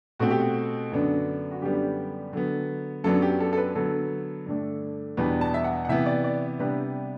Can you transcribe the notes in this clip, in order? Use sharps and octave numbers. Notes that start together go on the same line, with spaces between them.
B2 A3 C4 F#4
G4
F#4
F#2 D3 F#3 B3 D4
F#4
F#2 D3 G3 B3 D4 G4
D3 F#3 B3
F#2 F#3 B3 D4 A4
G4
A4
A4
B4
D3 F#3 B3 A4
G2 D3 A3 D4
E2 B2 G3 B3 D4 B4
A5
E5
F#5
F#5
C3 E3 B3 E5
D5
D5
C3 G3 B3 D4 B4